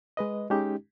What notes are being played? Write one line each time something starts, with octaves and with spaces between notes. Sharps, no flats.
G#3 B4 D#5
G#3 C#4 D#4 G4